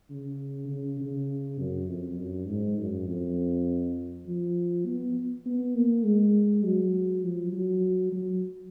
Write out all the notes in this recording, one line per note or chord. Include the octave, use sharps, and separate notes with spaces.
C#3
C#3
C#3
F#2
F2
F#2
G#2
F#2
F2
F3
B3
B3
A#3
G#3
F#3
F3
F#3
F#3